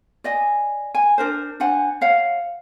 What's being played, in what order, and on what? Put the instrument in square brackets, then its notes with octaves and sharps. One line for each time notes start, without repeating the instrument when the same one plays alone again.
[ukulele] D5 D#5 G#5
G#5
D4 A#4 C5
D4 C5 F#5 G#5
C#5 F5 F#5